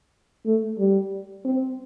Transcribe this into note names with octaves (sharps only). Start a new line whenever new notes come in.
A3
G3
C4